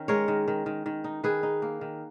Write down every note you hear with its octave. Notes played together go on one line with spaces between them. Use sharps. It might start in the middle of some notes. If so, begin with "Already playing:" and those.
Already playing: D#3 C#4
G#3 A#4 C#5
D#3
D#3
D#3
D#3
D#4
D#3 G#4 B4
D#4
A#3
D#3